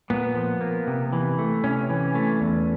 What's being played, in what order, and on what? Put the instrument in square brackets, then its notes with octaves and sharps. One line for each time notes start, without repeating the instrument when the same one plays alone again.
[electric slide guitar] A#2 B3
F3
A#3
C3
E3
A3
C3 C#4
E3
A3
E2